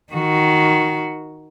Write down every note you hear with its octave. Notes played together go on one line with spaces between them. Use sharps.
D#3 F#4